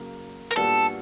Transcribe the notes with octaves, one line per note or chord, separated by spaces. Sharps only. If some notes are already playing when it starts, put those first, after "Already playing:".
Already playing: F#2 C#3 F#3 A#3
A#4
A#2 G3 B3 D4 F#4 A4